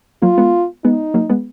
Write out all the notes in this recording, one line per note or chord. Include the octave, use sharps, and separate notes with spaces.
F#3 A#3 F4
G#3 B3
G#3 B3 D#4
F#3 A#3
G#3 B3